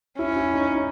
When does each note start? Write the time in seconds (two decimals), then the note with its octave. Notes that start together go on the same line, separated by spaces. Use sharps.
0.18 C#4 E4
0.36 E4
0.54 D#4
0.72 D#4